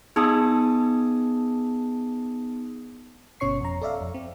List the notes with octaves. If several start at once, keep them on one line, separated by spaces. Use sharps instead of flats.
B3 D#4 G#4 A5 D#6 E6
G1 B2 C#4 C#5 C#6 C7
F2 A#5
A4 D5 E5 F5
F2
C4